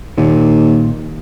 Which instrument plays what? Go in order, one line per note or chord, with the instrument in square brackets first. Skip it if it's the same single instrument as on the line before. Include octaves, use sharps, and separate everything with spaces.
[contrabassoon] D#2 [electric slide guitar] A#2 D#3